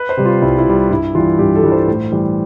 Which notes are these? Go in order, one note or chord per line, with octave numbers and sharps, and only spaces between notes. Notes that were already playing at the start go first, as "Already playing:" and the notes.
Already playing: B4
C5
C3 G3
F4
C2 E4
E4
C3 G3
G2 E4
E3 G3 F4
G2 G4
A4
E3 G3
C5
A2
E3 G3